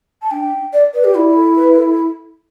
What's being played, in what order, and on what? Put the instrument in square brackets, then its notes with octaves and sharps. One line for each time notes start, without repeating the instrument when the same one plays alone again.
[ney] A5
[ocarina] D4 [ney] G5
[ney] D5
[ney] B4 [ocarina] D5
[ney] G4
[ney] E4 [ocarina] D5
[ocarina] A4
B4
A4